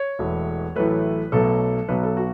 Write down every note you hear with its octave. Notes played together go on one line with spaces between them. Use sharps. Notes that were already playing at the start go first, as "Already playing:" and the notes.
Already playing: C#5
E1 E2 E3 A3
A1 A2 F#3 A3 B4
B1 B2 F#3 A3 A4
B1 B2 F#3 B4
A4
F#4